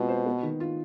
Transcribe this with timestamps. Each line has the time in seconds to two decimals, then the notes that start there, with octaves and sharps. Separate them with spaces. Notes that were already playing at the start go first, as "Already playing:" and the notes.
Already playing: B2 G#3 C4 F4
0.08 C5
0.26 B3
0.43 D#3
0.60 F4